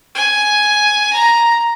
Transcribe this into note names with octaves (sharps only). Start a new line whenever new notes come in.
G#5
A#5